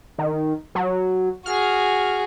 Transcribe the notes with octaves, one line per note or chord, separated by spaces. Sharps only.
D#3
F#3
F#4 G#4 F6